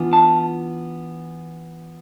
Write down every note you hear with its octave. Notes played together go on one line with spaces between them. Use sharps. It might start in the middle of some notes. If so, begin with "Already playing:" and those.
Already playing: E3 B3 D4 F4
A5